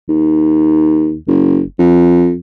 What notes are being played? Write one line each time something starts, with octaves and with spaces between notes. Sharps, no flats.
D#2
F#1
F2